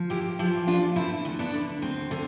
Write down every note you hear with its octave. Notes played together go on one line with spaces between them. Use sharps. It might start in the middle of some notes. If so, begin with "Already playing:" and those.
Already playing: F3
E2 E4 G4
F3 E4 G4
E2 D4 F4
D3 C4 E4
D2
B3 D4
D3
D2 C4
D3